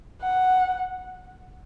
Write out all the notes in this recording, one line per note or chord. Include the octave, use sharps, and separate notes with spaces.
F#5